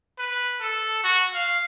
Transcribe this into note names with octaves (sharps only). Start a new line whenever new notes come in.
B4
A4
F#4
F5